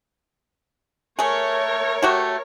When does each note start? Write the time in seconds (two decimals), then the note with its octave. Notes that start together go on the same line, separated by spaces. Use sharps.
1.19 A3 G#4 A#4 C#5
2.02 A3 F#4 G4